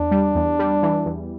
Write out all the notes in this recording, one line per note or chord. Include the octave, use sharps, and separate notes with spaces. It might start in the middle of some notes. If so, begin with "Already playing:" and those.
Already playing: E2 D4
G3
E2
G3
E3
E2